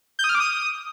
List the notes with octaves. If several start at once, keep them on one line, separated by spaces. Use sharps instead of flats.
G6
D#6
F6
D6
D#6